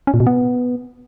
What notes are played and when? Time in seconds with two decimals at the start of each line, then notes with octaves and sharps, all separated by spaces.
0.07 C#4
0.14 A#2
0.20 B2
0.27 B3